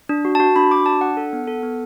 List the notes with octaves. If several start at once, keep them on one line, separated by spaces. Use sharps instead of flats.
D4
F#4
F#4 A5
D4 B5
F#4 D6
D4 A5
D4 F#5
A4
B3
A4
B3